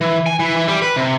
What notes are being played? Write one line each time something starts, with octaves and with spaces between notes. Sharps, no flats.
E3
G#5
E3
E3
G3
B4
C3